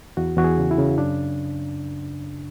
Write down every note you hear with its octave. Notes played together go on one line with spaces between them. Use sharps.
E2 F#4
E2 F#4
G#4
C#3
E4
C#3
F#2 D4